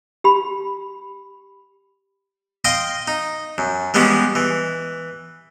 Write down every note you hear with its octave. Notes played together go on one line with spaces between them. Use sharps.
G4 B5
D#5 F5 G5 C6
D#4
F#2
E3 G3 G#3 B3 C#4
E3